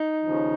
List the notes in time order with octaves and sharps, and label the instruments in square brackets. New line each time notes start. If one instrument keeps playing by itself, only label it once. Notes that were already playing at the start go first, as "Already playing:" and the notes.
Already playing: [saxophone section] D#4
D#2 C#3 F3